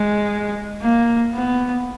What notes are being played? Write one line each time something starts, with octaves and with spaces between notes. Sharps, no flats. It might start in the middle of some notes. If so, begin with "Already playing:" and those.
Already playing: G#3
A#3
B3